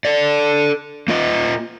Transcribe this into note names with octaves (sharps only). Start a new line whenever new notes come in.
A4 D5
A#3 F4 D#5